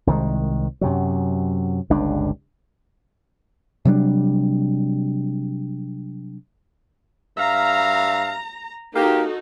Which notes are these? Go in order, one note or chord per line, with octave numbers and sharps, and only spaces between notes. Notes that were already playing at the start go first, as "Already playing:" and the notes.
C2 D#3 F#3 G#3
F#2 C3 F#3
G1 C#2 G2 D4
C3 F#3 G3 D4
G2 E5 F5 A#5
A#3 D#4 F#4 G4 A4